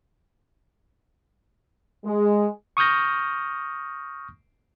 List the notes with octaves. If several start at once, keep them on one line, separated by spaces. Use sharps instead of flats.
G#3
C#6 D#6 F6 G6 A#6